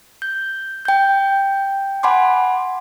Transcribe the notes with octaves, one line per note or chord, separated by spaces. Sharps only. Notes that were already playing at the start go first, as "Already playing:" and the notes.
G6
G5 G6
F#5 G#5 B5 C6 D6